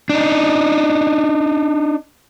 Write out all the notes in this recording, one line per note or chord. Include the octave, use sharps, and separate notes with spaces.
D4 D#4